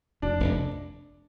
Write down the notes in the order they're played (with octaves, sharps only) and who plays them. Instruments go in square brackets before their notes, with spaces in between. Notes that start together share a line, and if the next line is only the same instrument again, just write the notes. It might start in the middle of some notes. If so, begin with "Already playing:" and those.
[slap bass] F1 [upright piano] D4
[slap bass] F1